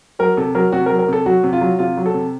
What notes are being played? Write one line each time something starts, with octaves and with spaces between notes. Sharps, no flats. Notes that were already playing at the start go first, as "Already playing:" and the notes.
F#3 A#4
C3 A4
F#3 A#4
C3 F#4
A#4
F#3
A#4
C3 A4
F#3 F#4
C3
F4
F#3
C3 F4
F#3
A4
C3